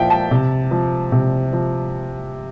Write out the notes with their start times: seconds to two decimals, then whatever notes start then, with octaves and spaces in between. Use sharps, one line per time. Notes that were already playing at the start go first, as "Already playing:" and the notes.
Already playing: A#2 F3 E5 F5 G5
0.10 A5
0.31 C3
0.71 F3
1.12 C3
1.53 F3